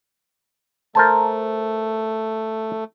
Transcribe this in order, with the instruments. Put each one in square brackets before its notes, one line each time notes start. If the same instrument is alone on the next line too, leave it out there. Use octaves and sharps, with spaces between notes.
[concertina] A3 [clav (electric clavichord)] A#4 C5 A5